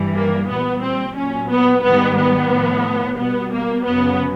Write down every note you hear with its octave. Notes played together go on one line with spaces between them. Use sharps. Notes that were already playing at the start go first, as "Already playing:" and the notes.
Already playing: G2 E3 G3
A#3
A#2 G3 B3
C4
A#2 F#3 C#4
B3
G#2 D#3 G3 B3
B3
A2 F3
B2 G3 B3
A#3
F#2 C#3 F#3 B3